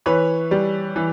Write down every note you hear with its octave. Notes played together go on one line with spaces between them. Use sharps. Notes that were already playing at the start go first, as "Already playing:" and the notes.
E3 B4 C#5
G3
E3